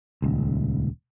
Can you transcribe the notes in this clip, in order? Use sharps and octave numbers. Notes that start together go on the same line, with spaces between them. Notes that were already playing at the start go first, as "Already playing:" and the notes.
D#1 C#2